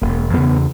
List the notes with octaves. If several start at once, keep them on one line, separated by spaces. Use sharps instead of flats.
E1 A#3
E2 C#3 B3